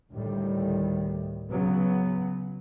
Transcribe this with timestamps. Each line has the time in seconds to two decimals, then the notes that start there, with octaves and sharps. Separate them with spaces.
0.13 D2 A2 D#3 G3
1.49 C#3 F#3 B3